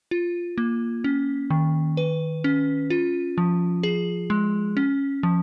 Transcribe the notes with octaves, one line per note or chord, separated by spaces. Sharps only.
F4
A#3
C#4
D#3
B4
C#4
F4
F3
G#4
G#3
C#4
F3